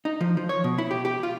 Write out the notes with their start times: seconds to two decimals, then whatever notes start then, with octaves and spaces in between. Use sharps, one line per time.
0.05 D#4
0.21 F3
0.37 F3
0.49 C#5
0.64 B2
0.78 E4
0.91 G4
1.05 G4
1.23 F4